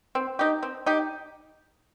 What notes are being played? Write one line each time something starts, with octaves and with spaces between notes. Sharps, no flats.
C4
D#4 G4
C4
D#4 G4